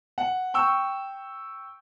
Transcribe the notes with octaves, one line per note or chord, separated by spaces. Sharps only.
F#5
G5 C#6 E6